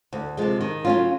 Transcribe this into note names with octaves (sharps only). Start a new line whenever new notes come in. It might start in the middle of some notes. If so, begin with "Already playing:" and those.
D2
C3 F3 G#3
D#3
F#3 A3 C#4 F4